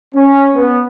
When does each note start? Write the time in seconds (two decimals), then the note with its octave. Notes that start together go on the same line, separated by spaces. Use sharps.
0.15 C#4
0.55 B3